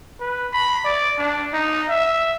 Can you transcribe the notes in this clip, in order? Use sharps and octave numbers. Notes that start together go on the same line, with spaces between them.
B4
B5
D5
D4
D#4
E5